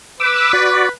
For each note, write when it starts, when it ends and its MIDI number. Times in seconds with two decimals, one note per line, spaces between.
0.20 0.90 71
0.20 0.52 86
0.20 0.52 88
0.53 0.89 66
0.53 0.89 74